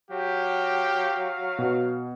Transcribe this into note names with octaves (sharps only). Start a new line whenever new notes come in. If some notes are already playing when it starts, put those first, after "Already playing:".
F#3 G4 F5
B2